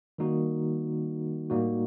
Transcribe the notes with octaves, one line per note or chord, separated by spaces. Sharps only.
D#3 G3 A#3 D#4 F#4
A2 G3 A#3 D#4 F#4